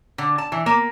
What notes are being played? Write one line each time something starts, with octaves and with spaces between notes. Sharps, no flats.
D3
A5
E3
A#3